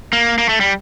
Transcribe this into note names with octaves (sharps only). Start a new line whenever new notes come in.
A#3
A#3
A3
G3